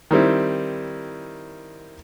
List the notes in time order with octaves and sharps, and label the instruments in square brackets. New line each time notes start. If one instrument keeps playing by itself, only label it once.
[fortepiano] D#3 G3 C4 E4